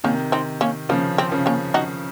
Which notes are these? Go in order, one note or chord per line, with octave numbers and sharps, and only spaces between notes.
C3 D#3 A#3 C#4
C4 D#4
A#3 C#4
C#3 F3 A#3
C4
C#3 F3
A#3 C#4
D#4 F#4